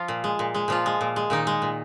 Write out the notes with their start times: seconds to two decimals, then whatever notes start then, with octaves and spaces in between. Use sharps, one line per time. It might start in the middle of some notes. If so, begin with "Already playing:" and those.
Already playing: F3 F4
0.08 A#2
0.24 G#3
0.39 A#2
0.55 G#3
0.68 A#2 F3 F4
0.86 G#3
1.01 A#2
1.16 G#3
1.30 A#2 D#3 D#4
1.47 G#3
1.62 A#2